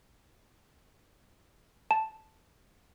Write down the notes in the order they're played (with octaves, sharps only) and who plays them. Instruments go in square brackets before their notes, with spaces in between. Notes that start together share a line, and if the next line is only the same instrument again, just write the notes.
[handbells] A5